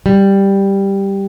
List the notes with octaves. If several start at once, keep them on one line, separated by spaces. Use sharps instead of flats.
G3